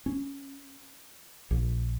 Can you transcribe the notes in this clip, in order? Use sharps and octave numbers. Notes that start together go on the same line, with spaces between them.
C#4
A#1